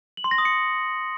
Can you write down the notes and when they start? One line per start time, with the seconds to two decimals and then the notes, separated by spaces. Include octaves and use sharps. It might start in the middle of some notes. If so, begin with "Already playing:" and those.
0.17 F#7
0.24 C6
0.31 A#6
0.38 D#6
0.45 C#7